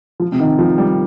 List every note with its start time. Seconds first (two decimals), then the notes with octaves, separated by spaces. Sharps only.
0.20 F3
0.32 C3
0.40 D#3
0.59 F3
0.78 G3